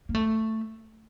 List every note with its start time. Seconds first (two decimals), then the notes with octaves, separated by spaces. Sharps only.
0.09 A#3
0.14 A3